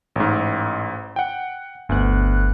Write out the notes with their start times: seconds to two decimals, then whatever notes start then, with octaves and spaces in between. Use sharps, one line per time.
0.16 A1 G#2
1.16 F#5 G5
1.89 G1 D2 B3 F#6